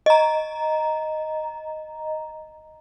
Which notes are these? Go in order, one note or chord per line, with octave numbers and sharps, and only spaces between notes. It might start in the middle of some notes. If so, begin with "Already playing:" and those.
D#5 A#5